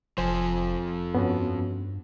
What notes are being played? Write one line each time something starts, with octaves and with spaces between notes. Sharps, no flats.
F1 F2 F3 C5 G#5
G2 B3 C#4 F#4